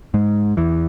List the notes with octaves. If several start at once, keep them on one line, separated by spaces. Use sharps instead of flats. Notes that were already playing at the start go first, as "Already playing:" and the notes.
G#2 G#3
E2 E3